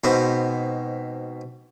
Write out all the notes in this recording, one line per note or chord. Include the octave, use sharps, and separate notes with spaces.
G#2 B2 C4 B4